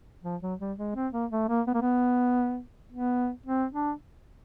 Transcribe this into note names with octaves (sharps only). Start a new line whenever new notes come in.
F3
F#3
G3
G#3
C4
A#3
A3
A#3
B3
A#3
B3
B3
C4
D4